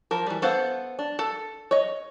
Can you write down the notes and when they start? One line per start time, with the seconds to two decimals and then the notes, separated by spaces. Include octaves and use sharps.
0.11 F3 A#4
0.27 E3 G3
0.42 B3 A4 C5 F5 F#5
0.99 D4
1.19 A4
1.71 C#5 D#5